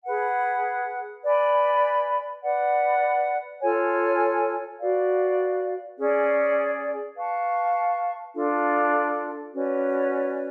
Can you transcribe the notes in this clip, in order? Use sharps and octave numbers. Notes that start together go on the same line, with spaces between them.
G#4 B4 F#5
B4 D5 G#5 B5
B4 D5 F#5
F4 A4 C#5 G#5
F#4 B4 D5 F5
C#4 G#4 D5
B4 F5 A5 C#6
D4 F4 A4
C#4 F#4 B4 D5